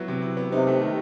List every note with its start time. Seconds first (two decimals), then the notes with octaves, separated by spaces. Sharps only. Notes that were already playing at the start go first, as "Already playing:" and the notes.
Already playing: F#3 B3 E4
0.08 C3
0.22 E4
0.37 B3
0.52 C3 D#4
0.67 A3
0.81 D#3